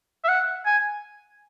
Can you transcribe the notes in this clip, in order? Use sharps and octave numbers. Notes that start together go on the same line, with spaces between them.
E5
F#5
G#5